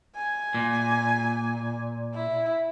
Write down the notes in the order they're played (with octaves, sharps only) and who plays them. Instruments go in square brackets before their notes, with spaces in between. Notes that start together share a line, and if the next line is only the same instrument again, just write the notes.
[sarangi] G#5
[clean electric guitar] A#2
[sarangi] E4